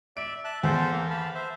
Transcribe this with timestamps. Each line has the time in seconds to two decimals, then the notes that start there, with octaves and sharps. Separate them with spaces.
0.17 D5 E5 D7
0.45 E5 A5 F#6
0.63 E2 F4 A4 C5
0.91 A#3
1.10 F5 A5 B5
1.35 C5 E5